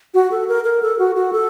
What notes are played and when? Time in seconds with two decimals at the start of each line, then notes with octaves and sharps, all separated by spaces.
0.14 F#4
0.31 A4
0.48 A#4
0.64 A#4
0.82 A4
0.99 F#4
1.15 F#4
1.33 A4